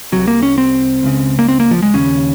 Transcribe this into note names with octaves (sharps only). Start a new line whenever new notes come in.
C2 C3 F#3
A#3
C#4
C4
C#2 C#3
A#3
C4
A#3
F3
G#3
D#2 C#3 C#4